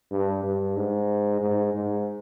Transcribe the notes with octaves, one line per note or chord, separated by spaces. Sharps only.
G2
G2
G#2
G#2
G#2